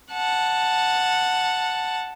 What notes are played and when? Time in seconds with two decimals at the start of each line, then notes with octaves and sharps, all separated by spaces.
0.12 F#5 A5